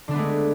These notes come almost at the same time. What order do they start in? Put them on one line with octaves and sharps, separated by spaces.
D3 D4 B3 A3 G#3